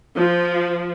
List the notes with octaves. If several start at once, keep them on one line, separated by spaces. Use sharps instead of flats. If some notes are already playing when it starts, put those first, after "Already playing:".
F3